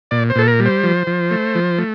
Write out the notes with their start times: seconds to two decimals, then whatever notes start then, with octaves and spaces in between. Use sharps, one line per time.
0.11 A#2 D5
0.30 C5
0.35 A#2 A4
0.48 A#4
0.60 G3
0.66 C5
0.83 F3
1.07 F3
1.31 A3
1.55 F3
1.78 A3